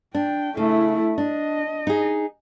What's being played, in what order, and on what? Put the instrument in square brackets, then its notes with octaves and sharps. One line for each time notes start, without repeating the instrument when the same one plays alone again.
[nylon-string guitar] D4 [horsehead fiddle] G5
[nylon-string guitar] C#3 [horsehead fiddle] A3 E4
[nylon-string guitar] D4 [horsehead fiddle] D#5
[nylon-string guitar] D#4 G#4